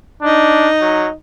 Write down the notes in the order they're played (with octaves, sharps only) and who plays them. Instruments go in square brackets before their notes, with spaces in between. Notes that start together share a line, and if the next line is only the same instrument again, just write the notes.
[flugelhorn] D4 [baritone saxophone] D#4
[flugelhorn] F#3